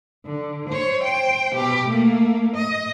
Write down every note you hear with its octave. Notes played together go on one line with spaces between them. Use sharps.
D3
C5 C#5
C5 G5
B2 G4
A3 A#3
D#5